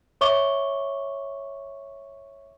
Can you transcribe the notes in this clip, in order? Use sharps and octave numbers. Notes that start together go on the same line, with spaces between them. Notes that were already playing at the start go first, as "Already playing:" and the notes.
C#5 E5 C#6 D6 G7